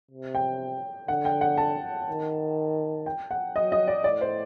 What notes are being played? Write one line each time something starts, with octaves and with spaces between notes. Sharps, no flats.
C3
G5
D3 F#5
G5
F#5
A5
D#3
G5
F#5
F#3 D#5
D#5
D5
A2 D5
C5